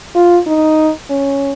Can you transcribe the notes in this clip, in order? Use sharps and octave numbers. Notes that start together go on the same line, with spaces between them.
F4
D#4
C#4